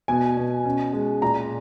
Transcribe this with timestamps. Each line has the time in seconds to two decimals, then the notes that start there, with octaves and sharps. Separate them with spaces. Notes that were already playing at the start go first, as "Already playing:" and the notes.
0.08 B2 G#5
0.37 B2
0.65 C#4
0.93 G#3
1.22 A#2 A#5